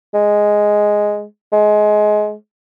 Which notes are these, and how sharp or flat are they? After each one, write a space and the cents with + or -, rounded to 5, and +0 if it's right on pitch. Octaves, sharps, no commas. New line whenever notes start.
G#3 +0
G#3 +20